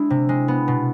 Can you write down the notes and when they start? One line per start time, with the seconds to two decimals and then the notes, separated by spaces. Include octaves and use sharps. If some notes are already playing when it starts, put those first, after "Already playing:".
Already playing: G#3 D4 E4
0.10 C3
0.29 G#3
0.48 B3
0.68 B2